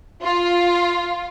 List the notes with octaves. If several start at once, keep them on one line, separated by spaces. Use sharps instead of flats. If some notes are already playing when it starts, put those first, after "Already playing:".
F4